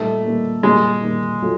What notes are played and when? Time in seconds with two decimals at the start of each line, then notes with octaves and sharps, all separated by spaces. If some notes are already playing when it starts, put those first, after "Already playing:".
Already playing: A#2 G3 A3 A#3 D#4
0.25 A#2 G3 A#3 D#4
0.63 A#2 G3 G#3 A#3 D#4
1.02 A#2 G3 A#3 D#4
1.42 F#3 A3 F4 A4